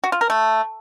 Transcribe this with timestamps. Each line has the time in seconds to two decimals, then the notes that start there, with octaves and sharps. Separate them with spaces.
0.04 F#4
0.12 F4
0.21 A#4
0.30 A3